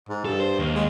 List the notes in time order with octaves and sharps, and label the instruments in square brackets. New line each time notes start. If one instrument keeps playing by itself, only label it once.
[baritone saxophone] G#2
[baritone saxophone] G2 [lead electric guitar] A4
[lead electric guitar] C5
D#2
[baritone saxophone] G#3